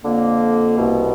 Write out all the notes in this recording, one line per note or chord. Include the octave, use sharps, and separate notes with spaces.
F2 D3 A#3
C2 B2